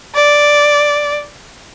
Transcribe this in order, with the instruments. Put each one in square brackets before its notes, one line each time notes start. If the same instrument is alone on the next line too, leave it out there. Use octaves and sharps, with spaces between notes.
[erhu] D5